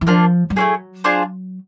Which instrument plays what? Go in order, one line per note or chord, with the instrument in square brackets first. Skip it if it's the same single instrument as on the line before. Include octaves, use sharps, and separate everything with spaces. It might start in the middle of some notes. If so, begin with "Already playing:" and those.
[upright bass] E3
[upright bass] F3 [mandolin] A#3 D4 F4
[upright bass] G3
[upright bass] F#3 [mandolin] A3 C#4 E4 G#4
[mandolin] D4 F4 G#4 C5